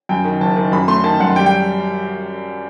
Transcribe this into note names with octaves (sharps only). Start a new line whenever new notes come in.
F#2 G5
D#3
F#1 A5
D#3
F#2 B5
A3 C6
D#3 A5
F#2 F#5
G3 G5
G5